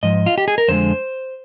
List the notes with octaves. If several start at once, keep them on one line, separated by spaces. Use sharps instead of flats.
G#2 F3 D#5
F4
G4
G#4
A#4
F2 D3 G#3 C5